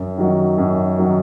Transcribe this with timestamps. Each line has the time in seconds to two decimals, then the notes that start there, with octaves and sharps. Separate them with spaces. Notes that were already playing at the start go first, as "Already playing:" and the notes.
Already playing: F#2
0.18 D#3 F#3
0.58 F#2
0.98 D#3 F#3